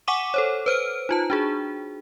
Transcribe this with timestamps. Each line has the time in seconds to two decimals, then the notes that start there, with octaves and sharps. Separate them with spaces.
0.07 F#5 G#5 C#6 D6 D#7 E7
0.34 A4 C5 C#5
0.66 B4 C5 F6 D7
1.09 D#4 F4 A5
1.30 D4 F#4 G#4